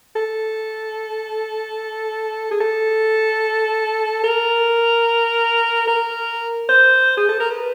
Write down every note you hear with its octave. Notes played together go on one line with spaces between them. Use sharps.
A4
G#4
A4
A#4
A#4
C5
G#4
A4
A#4
B4